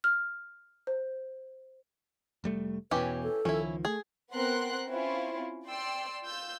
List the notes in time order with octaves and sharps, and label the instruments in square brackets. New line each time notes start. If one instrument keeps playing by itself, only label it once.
[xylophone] F6
C5
[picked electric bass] F1 G3 A3
[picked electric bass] E2 B2 [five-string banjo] E3 C#4 G4 [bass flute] B4
[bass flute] A4
[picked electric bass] C#2 D#3 F3 [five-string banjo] C#4 E4
[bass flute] A3 [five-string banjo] G#4
[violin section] B3 C4 A#4 F#5 C6 F#6
C4 C#4 E4 F4
D5 G5 C6 E6
F4 E6 G6